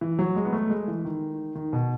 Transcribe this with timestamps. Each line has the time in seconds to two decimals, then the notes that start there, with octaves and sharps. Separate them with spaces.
0.01 E3
0.19 F#3
0.36 G#3
0.45 B3
0.53 A3
0.70 G#3
0.88 E3
1.05 D#3
1.55 D#3
1.73 B2